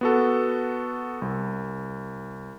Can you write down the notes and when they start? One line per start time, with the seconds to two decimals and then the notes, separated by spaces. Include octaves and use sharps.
0.01 B3 F#4 A4
1.22 C2